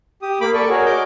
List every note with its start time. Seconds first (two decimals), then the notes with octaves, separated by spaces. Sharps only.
0.22 G4 D#6
0.41 A#3 B5 D6
0.54 A4 D5 C#6
0.69 F#4 G#4 A#4 C#5
0.86 A#4 D#5 D6 G6